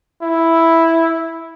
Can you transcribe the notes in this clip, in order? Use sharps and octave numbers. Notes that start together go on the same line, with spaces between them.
E4